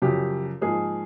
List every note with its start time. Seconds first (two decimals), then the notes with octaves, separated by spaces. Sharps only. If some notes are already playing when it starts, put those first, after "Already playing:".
0.02 F#2 C#3 F3 G4
0.61 G#2 F3 A#3 G#4